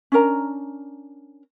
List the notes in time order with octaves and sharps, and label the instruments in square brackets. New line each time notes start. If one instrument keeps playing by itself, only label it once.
[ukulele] C#4 D4 A#4 A#5